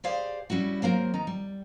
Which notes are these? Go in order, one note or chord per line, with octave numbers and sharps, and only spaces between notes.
G4 G#4 C5 D5 F5
G3 C#4 E4 F#4
F#3 A#3 C4 A#4
D#3 D#4 A#5
G3